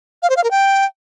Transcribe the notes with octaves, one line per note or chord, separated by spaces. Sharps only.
F5
C5
F5
A#4
G5